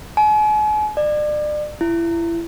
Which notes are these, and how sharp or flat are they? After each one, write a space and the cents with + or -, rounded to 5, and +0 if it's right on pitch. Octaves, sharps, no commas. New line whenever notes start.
G#5 +40
D5 +35
E4 +25